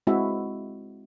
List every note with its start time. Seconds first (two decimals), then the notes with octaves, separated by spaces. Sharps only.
0.07 G#3 C4 E4 F#4 E5